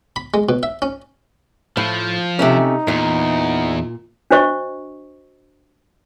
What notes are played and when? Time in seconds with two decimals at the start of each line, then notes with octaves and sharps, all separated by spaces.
0.16 B5
0.34 G#3
0.49 B2
0.63 E5
0.82 C#4
1.77 A2 F3
2.39 C3 A3 C#4 D#4
2.88 E2 A#2
4.31 D4 F#4 C5 D#5 C#6